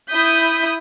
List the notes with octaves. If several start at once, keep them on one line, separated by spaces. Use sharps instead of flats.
E4 D#6 G6 B6